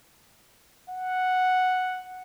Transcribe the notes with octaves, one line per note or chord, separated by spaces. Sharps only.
F#5